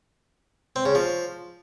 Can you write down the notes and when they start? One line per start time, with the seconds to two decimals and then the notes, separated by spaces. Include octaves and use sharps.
0.76 C4
0.85 C#3
0.95 F3